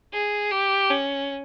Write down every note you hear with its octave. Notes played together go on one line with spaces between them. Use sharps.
G#4
G4
C#4